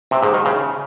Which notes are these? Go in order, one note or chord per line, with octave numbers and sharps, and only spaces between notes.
C3
G#2
D#3
C#3